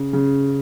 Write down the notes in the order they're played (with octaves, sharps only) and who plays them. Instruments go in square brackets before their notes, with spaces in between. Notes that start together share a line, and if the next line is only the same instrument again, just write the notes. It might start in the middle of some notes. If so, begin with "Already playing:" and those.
Already playing: [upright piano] C#3
C#3